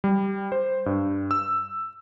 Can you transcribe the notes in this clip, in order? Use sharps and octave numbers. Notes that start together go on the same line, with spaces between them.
G3
C5
G2
E6